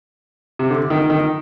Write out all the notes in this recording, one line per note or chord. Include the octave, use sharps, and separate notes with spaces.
C3
D3
D#3
D#3